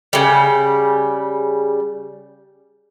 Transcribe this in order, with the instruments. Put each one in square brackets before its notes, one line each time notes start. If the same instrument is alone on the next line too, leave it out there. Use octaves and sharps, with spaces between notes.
[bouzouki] C#3 G3